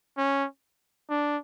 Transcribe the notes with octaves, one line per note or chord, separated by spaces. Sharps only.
C#4
D4